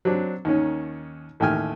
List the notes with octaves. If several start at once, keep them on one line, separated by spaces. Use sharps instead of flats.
F#3 C4 D4
D#2 D#3 C#4
A1 D#2 A3 G5 G#5 F6